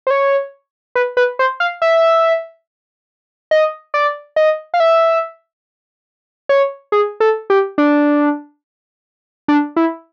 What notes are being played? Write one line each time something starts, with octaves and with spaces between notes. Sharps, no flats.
C5
C#5
B4
B4
C5
F5
E5
D#5
D5
D#5
F5
E5
C#5
G#4
A4
G4
D4
D4
E4